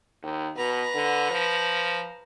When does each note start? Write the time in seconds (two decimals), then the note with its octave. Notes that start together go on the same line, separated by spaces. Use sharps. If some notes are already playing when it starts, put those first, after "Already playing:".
0.23 D#2
0.56 B2 B4 A#5
0.95 D3
1.30 F3